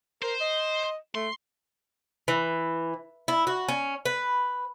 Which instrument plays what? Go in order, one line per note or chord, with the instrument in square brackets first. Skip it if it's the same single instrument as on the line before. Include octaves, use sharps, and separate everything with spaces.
[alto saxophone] A#4 [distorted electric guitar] C5
[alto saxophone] D#5
[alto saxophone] A3 [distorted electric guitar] C6
[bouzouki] E3
E4
F#4
C#4
B4